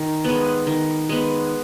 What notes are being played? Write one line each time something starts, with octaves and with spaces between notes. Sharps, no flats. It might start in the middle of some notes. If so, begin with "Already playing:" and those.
Already playing: D#3
G#3 B3
D#3
G#3 B3